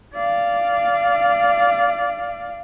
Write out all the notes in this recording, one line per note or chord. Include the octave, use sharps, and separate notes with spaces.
D5 F5